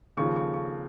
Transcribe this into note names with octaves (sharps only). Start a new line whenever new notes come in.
D#2 C#3 F3 C#6
C#6
C#6